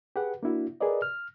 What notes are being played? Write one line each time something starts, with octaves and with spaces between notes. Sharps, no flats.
G4 G#4 B4 F#5
A#3 D4 E4 F#4
G4 G#4 A#4 B4 D5 D#5
F6